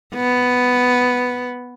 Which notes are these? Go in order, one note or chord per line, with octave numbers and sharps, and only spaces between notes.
B3